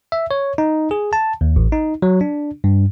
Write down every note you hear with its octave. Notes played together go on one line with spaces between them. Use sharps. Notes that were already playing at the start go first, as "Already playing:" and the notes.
E5
C#5
D#4
G#4
A5
D#2
A1
D#4
F#3
D4
G2